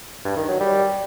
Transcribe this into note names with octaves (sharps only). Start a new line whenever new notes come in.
G2
D#3
F#3
G3